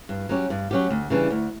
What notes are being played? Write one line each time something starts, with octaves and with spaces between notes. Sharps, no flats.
G2
F#3 C#4 G4
G2
F#3 C#4 G4
D2
C#3 E3 G3 D4
D2